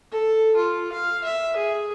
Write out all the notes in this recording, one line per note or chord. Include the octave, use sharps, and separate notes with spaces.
A4
F4
F5
E5
G#4